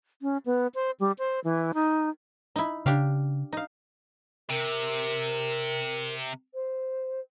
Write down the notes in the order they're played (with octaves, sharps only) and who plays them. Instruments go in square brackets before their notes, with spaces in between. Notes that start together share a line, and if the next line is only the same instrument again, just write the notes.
[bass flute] C#4
B3
C5
G3
C5
E3
D#4
[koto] D#4 E4
[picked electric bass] C#3 [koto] D4 G4 F5
[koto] D#4 F5
[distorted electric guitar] C3 [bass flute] A#4
[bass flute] C5